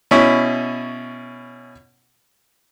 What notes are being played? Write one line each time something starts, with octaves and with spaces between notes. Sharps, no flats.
B2 C#4 E4 C#6